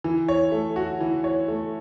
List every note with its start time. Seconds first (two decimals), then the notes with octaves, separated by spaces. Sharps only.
0.04 E3
0.28 C#5
0.52 A3
0.76 F#4
1.01 E3
1.24 C#5
1.48 A3